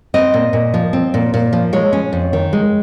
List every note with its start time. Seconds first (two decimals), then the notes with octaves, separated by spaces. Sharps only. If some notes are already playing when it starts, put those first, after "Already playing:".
0.14 C4 D#5
0.34 A#2
0.53 A#2
0.74 F3
0.93 C4
1.14 A#2
1.34 A#2
1.53 F3
1.73 G#3 C#5
1.93 C#4
2.13 F2
2.33 D#3
2.53 G#3